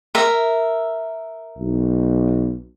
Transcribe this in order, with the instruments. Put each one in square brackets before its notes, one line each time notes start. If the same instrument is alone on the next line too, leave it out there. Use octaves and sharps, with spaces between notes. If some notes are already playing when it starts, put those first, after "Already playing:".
[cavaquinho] A#4 E5
[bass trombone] B1